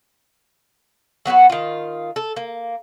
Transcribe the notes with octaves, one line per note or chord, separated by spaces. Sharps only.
F#3 B3 F#4 B4
D#3 F4
A4
A#3